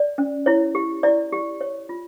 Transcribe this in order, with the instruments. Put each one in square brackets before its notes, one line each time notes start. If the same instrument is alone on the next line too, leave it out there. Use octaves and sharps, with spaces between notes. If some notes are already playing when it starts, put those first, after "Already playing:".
Already playing: [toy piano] D5
C#4
E4 C#5
G4
E4 D5
G4
C#5
F4